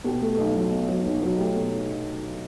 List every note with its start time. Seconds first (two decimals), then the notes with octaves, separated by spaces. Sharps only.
0.04 B2 G4
0.21 A3
0.38 B1
0.55 F#3
0.71 B2
0.88 F#3
1.05 B1
1.22 F#3
1.38 A3 G4
1.55 B2